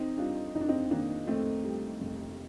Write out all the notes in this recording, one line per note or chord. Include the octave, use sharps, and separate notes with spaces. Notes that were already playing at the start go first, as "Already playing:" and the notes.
Already playing: F2 C4 D#4
G3 D4 F4
F1 D#4
D4
C4 D#4
D#3 A#3 D4
F2 A3 C4
G3
F1